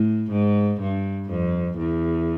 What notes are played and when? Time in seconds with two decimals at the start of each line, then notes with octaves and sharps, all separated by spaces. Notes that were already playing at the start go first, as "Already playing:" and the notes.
Already playing: A2
0.31 G#2
0.81 G2
1.30 F2
1.78 E2